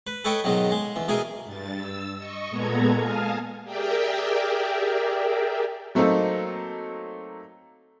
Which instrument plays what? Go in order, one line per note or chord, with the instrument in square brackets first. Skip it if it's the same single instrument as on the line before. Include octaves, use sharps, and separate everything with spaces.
[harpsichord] B4
A4 B4 C#5 D#5 G5
G#2 B2 D#3 F#3
G#3
E2
B2 E3 G#4 A#4
[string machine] G2 A6
E6
D#5 C#6
A#2 G#3 B3 A4 A#5 G#6
F5 G#5 A5 D#6 F6
G4 G#4 A#4 D5 E5 G5
[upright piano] F#3 A3 A#3 C4 D#4 A4